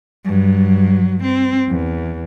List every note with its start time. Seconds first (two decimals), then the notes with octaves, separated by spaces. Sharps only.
0.25 G2 F#3
1.23 C4
1.69 E2